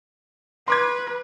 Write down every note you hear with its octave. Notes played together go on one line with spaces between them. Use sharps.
B4 C6 D6 G#6